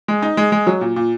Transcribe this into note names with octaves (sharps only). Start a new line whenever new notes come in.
G#3
D#4
G#3
G#3
F#3
A#2
A#2